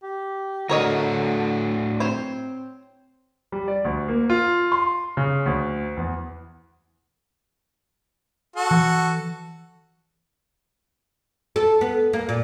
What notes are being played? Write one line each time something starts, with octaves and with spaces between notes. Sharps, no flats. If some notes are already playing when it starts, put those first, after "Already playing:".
G4
A2 D3 D4 F#4 A#4 C#5 D#5
C4 C5 C#5
G3
D5
D2
A#3
F4
C6
C#3
D2
E2
F#4 A4
E3
A4
B3
A#3
A#2